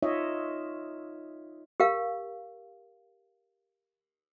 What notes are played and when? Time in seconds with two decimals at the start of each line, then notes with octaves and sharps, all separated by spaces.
0.02 D#4 F4 C#5 D#5 E5
1.80 G4 A#4 F5